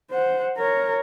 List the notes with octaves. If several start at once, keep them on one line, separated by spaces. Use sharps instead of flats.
C5 F#5
A#4 C#5